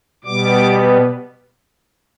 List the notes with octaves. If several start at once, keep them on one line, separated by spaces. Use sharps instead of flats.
B2 G3 B3 D6